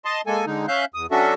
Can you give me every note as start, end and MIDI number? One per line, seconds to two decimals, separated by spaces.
0.05 0.21 75
0.05 0.21 81
0.05 0.21 84
0.27 0.45 56
0.27 0.45 58
0.27 0.45 69
0.27 0.45 80
0.46 0.66 50
0.46 0.66 56
0.46 0.66 63
0.68 0.85 61
0.68 0.85 76
0.68 0.85 77
0.68 0.85 90
0.68 0.85 91
0.94 1.06 40
0.94 1.06 87
1.11 1.34 54
1.11 1.34 61
1.11 1.34 62
1.11 1.34 66
1.11 1.34 69
1.11 1.34 76